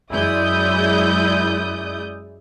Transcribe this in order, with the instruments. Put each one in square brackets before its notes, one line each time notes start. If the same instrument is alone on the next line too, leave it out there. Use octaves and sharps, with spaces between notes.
[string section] F#2 G#3 E4 D5 D#6 G6